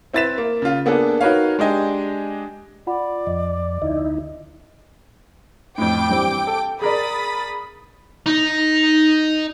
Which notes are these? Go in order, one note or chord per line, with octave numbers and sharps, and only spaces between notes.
C4 E4 B4 A6 B6 E7
A#3
C#3 F4
A#3 B3 D4 G#4 A4
D#4 F#4 A#4 B4 C#5 F5
G#3 D4 G4 D#5 G#5
F4 D5 F#5 B5
F2 D#5
D2 D#4 E4 D#5
F2 A2 G5 D6 D7
G2 E3 C4
A4
G#4 A#4 D5 B5 D#6 A6
D#4